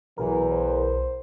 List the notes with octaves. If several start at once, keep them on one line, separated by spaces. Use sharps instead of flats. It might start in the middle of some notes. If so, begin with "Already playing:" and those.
B1 E2 B2 E3 A#4
C5